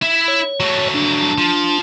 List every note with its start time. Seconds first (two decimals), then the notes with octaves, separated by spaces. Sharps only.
0.02 E4 E5
0.28 C#5
0.60 F#3 A3
0.94 D4 A5
1.38 F3